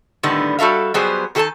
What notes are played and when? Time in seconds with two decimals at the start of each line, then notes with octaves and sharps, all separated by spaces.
0.23 A2 D3 D#3 G3 B3
0.59 G3 F#4 A4 E5 F5
0.94 F#3 G3 B3 G4 G#4 C5
1.35 D#3 G4 A4 C5 G#5 A5